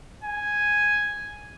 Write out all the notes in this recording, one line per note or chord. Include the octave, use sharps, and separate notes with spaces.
G#5